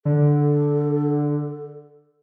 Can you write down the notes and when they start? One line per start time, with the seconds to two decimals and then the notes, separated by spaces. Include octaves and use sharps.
0.05 D3 A4